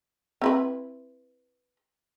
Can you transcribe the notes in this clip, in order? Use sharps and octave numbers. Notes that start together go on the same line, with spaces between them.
C4 E4 B4